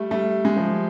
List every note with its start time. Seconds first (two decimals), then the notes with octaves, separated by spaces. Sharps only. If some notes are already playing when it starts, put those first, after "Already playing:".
Already playing: G3 A3
0.11 G3 A3
0.45 G#3
0.56 F3 G3